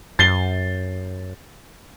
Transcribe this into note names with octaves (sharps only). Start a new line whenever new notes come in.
F#2 A6 C7 G7